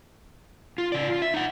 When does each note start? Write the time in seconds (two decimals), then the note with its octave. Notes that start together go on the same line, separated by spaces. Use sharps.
0.78 F4
0.92 C#3 D5
1.08 F4
1.22 E5
1.34 D#4 F#5